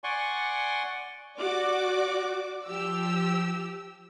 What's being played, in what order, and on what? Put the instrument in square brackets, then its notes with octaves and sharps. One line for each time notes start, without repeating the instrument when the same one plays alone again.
[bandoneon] D5 F#5 G#5 C6 C#6
[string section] F#4 D5 D6
F3 G4 E6